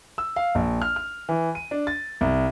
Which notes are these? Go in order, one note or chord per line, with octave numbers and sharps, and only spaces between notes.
E6
F5
A#1
F6
F6
E3
D#7
D4
A6
C2